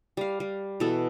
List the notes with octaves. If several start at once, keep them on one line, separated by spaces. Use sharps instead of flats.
G3 F5
G3
B2 E3 F#4 A4